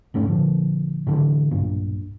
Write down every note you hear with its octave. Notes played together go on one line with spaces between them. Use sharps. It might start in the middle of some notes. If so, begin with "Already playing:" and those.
E1 G#2 A3 C#4
F2 A#2 D3 F3
A2 D3 E3
B1 G2 A#2